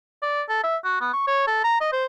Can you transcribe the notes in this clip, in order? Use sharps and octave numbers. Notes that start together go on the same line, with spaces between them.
D5
A4
E5
F#4
B3
C#6
C#5
A4
A#5
D#5
C5